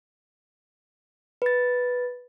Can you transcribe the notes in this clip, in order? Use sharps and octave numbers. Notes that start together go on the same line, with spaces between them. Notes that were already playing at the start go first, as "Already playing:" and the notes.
B4 A6